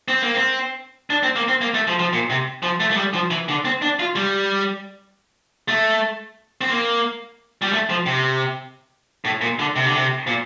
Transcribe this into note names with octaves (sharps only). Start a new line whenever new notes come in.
C4
A#3
C4
D4
C4
A#3
C4
A#3
A3
F3
F3
A#2
C3
F3
A3
A3
G3
F3
E3
D3
C4
D4
F4
G3
A3
C4
A#3
G3
A3
F3
C3
A2
A#2
D3
C3
D3
C3
A#2